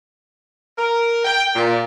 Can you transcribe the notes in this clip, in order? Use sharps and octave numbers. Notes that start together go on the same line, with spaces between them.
A#4
G5
A#2